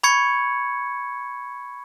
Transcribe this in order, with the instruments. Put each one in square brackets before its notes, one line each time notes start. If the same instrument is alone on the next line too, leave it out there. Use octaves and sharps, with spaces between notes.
[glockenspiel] B5 C#6 G#6 C#7